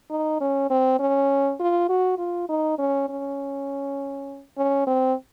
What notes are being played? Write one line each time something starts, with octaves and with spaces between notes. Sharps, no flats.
D#4
C#4
C4
C#4
F4
F#4
F4
D#4
C#4
C#4
C#4
C4